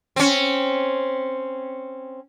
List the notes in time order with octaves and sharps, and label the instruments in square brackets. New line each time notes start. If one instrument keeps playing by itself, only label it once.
[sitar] C4 C#4